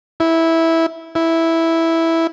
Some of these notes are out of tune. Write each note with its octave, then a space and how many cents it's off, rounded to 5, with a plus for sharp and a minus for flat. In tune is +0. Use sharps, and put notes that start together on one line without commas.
E4 -10
E4 -5